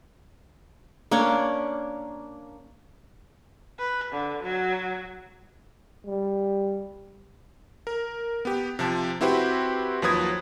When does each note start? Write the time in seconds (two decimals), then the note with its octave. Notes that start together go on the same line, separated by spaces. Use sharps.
1.11 A#3 C#4 D4 C#5
3.79 B4
4.13 D3
4.44 F#3
6.06 G3
7.87 A#4
8.45 B3 G4
8.79 C3 F3 A5
9.21 C4 E4 F#4 G4 B4 C5
10.02 D#2 F3 F#3 B4 D#6 G#6